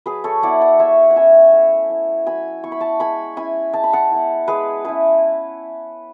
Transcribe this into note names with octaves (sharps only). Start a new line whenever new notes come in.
F#3 G#4 B4
A4 C#5
B3 E4 D5 F#5
D5 F#5
G#3 C#5 E5
F#5
C#4 E4 E5 G#5
A3
E4
F#3 G#5 B5
B3 E4 C#6
B5
A5 C#6
G#3 G#5 B5
C#4 E4 G#5 B5
G#3 A5
B5
F#5 A5
B3 E4
G#3 G#4 B4
C#4 E4 G#4 B4